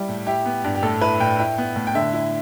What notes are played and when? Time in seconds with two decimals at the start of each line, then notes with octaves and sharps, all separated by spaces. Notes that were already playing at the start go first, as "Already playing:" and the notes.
Already playing: G3 E4
0.09 A2
0.27 E4 G4
0.45 B3
0.64 G2
0.75 G4
0.83 A2 A4
1.01 E4 B4
1.20 A2 G5
1.39 E4 G5
1.58 B3
1.76 A2
1.87 G5
1.95 D3 E5
2.13 E4